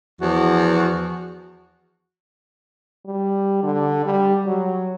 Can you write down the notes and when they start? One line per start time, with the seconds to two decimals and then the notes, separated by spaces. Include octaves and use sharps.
0.21 E2 F3 F#4
3.06 G3
3.63 D3
4.05 G3
4.46 F#3